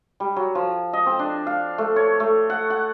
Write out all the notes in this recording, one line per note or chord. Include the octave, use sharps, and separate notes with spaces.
G3
F#3
F3
D#5
C4
D4
F5
A3
C#5
A3
F#5
F#5